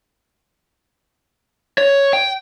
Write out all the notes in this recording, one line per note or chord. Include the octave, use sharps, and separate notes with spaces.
C#5
G5